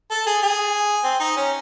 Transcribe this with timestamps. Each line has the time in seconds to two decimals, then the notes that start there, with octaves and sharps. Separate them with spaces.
0.11 A4
0.27 G#4
0.43 G#4
1.04 C4
1.20 D#4
1.37 C#4